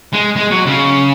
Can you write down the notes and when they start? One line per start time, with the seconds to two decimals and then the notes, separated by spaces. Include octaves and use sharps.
0.13 G#3
0.36 G#3
0.51 F#3
0.66 C#3